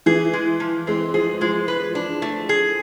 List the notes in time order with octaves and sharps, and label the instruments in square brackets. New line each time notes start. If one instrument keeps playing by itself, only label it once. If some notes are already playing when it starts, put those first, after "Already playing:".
[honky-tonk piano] E3 [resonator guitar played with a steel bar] G#4
[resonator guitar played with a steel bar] G#3
F3
[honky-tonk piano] G#3 [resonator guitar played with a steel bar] C4
[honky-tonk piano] F3 [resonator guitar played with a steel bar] G#4
[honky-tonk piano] F3 [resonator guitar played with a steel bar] G#3
[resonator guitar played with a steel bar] B4
D4
A3
G#4